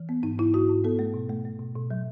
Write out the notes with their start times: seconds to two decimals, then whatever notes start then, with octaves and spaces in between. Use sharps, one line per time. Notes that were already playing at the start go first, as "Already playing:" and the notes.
Already playing: E3
0.09 B3
0.23 G#2 D#4
0.38 G#2 E4
0.54 G#2 F#4
0.69 G#2
0.84 B3 A4
0.99 A3
1.14 B2
1.30 A3
1.45 A3
1.60 B2
1.75 B2
1.91 F#3